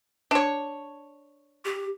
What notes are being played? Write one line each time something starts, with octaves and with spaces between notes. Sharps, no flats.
D4 C#5
G4